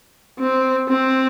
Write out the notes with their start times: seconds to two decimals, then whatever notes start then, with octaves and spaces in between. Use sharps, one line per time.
0.39 C4
0.89 C4